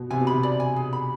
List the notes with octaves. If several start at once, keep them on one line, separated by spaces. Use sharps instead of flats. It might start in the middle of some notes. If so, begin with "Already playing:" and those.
Already playing: B2
C3 G#5
B2
C3 B5
D5
G#5
G#4
B5